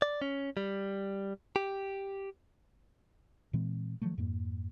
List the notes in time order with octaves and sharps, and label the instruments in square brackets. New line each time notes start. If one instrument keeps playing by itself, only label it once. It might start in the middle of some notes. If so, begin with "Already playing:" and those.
[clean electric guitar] D5
C#4
G3
G4
[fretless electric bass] A#2 E3 G#3 C4
D#3 F3 F#3 A3
F2 G#2 A#3